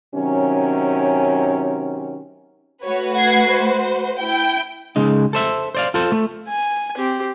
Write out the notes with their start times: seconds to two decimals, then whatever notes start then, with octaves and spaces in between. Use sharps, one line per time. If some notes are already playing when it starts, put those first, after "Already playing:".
0.14 C3 D#3 F#3 C#4
2.84 A3 F#4 B4 C#5
3.16 F#5 G#6 C7
3.51 C5
4.20 E4 G5
4.96 C#3 G#3 D#4
5.33 A4 C5 E5
5.75 C5 D5 F5
5.94 F4 A4 C5
6.12 A3
6.48 G#5
6.97 C4 G4